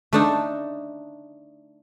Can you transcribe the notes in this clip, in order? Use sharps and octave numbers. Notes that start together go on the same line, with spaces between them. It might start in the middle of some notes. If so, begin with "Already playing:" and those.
A3 D4 D#4